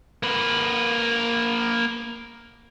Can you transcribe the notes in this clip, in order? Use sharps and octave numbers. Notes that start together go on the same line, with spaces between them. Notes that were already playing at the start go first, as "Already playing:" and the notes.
A#3 B4